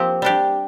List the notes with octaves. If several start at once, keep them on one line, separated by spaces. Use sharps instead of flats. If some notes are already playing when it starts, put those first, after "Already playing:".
Already playing: F3 A#3 C4 G4
G3 D4 G4